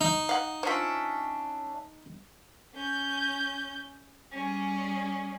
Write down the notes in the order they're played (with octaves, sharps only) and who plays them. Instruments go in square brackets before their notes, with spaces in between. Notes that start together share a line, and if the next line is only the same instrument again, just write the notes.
[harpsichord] D#4
[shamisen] F5 F#5
[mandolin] C#4 D4 E5 [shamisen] F4 C5
[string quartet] C#4 G6
G3 C#4 G#4